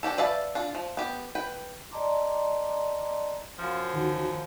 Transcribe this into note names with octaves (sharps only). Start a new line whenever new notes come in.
D4 F#4 G4 A4
B4 D5 E5 F5 A5
D4 F4
F3
B3 G4
B4 G5
D5 D#5 A5 A#5 C6 D6
F#2 F3 F5
D2 D#3 F#4